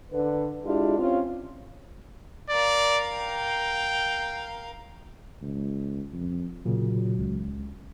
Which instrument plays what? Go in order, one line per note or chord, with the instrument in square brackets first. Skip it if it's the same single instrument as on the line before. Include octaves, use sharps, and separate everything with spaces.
[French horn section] D3 B4
G#3 D4 E4 F4 G4
C4 C#4 F4
[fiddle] A#4 F5 [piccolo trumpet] D5
[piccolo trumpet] G5
[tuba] C#2
F2
[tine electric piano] A#2 C#3 [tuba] F#3
[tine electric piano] C#2